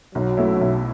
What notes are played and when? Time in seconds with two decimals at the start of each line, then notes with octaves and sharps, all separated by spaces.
0.15 B1 F#3
0.37 B2 A3 C#4 E4
0.61 B1